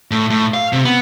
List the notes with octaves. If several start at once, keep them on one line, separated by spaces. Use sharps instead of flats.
A2
A2
F5
C3
B3